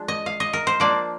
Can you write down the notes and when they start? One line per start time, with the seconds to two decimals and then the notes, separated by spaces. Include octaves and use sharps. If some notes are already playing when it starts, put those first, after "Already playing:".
Already playing: F3 G#3 D4
0.08 D#5
0.26 F5
0.40 D#5
0.53 A#4
0.67 C5
0.80 F3 A#3 D4 D5